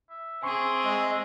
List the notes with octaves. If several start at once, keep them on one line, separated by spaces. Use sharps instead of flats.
E5
C4 G#4 G#5 C6 C#6
G#3